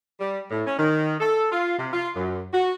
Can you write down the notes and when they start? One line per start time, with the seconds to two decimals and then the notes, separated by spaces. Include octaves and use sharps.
0.20 G3
0.51 A2
0.67 C#4
0.79 D#3
1.21 A4
1.52 F4
1.79 C3
1.93 F4
2.16 F#2
2.53 F#4